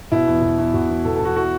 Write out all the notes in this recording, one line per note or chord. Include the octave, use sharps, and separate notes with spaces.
B2 E4
E2
B2
E2
B2 F#4
E2
B2 A4
E2 A4
F#4
E3 F#4